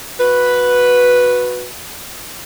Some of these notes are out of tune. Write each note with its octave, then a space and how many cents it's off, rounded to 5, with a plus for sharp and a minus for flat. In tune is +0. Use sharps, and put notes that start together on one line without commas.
F#4 -20 B4 +0